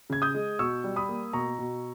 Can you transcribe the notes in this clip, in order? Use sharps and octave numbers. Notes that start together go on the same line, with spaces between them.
C#3 G#6
D#6 G6
G#3
B2 C#6 E6
G3
B5 D#6
A#3
B2 A#5 C#6
B2